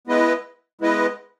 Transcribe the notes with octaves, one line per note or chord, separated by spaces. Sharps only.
G#3 B3 E4 B4 D#5
G#3 B3 E4 B4 D#5